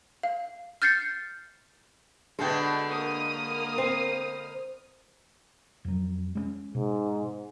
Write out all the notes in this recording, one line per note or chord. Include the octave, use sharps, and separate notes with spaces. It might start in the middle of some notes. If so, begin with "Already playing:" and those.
F5
F6 G6 A6 C7 C#7
B2 D3 G#3 A4 G5
A#3 D#6 F6
C4
F2 F#3
G#3 A#3 C#4
G#2 B2